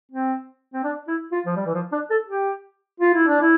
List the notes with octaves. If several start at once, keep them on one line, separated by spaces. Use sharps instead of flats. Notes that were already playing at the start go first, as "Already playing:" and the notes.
C4
C4
D4
E4
F4
F3
G3
E3
F3
D4
A4
G4
F4
E4
D4
E4